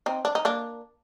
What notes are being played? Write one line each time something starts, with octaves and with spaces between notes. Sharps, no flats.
C4 D#4
D4
D#4
A#3 D4